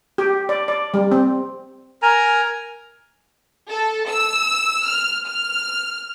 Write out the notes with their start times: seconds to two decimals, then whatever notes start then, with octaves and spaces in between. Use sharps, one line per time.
0.18 G4
0.49 D5
0.68 D5
0.94 G3
1.12 C4
2.02 A#4 G#5 A#5
3.69 A4
4.08 E6
4.85 F6
5.28 F6